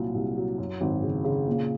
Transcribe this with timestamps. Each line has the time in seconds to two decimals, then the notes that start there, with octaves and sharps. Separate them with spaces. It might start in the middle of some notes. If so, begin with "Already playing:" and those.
Already playing: C2 A#2 F#3
0.15 C2
0.37 F#3
0.58 F#2
0.81 G#1
1.03 C#3
1.24 C#3
1.48 A#2